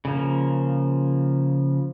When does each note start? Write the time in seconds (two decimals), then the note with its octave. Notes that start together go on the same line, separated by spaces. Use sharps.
0.05 C#3 F3 A#3